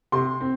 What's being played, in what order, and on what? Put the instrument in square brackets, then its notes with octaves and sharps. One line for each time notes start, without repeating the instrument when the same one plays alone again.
[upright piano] C3 C6
C4